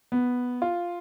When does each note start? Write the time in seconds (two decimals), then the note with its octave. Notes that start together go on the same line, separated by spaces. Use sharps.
0.12 B3
0.62 F4